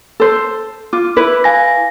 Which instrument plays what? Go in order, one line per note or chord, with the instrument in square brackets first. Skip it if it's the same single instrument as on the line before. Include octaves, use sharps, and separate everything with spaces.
[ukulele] A4 C5
[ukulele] F4 [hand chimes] D6
[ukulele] E4 B4
[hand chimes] F5 G#5 A#6